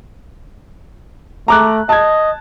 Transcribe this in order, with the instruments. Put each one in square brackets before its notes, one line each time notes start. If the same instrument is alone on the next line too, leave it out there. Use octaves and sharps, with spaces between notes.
[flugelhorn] A3 [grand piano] A#5 D6 F#6
[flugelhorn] D#5 [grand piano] A5 G#6